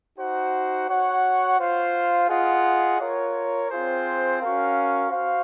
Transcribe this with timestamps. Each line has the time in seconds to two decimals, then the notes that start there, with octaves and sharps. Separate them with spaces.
0.18 D#4 F#4 C5 F#5
0.89 F#4 C#5 F#5
1.59 F4 C5 F5
2.29 F4 G#4 D#5 F#5
2.99 F4 A#4 C#5
3.70 C4 F4 G#4 C5
4.41 C#4 F#4 A#4 F5
5.11 F#4 C5 F5